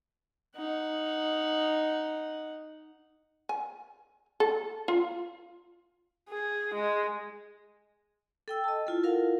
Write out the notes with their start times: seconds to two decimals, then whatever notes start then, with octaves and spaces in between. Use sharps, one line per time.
0.56 D#4 F#5
3.49 G#5
4.40 A4
4.88 F4
6.29 G#4
6.74 G#3
8.48 A4 G5 E6
8.64 D#5 A5
8.87 E4 F4 A4
9.03 E4 F4 A#4 F5 F#5